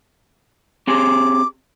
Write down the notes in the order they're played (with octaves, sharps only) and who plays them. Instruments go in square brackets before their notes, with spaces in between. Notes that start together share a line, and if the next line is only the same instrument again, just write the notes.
[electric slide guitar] C4 G4 G#4 [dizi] D6